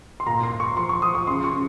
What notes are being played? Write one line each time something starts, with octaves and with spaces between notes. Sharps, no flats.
C6
A#2 A#5
C6
A#2
C#6
F3 C6
C#6
F3 D#6
C#6
C#3 C6
C#6
C#3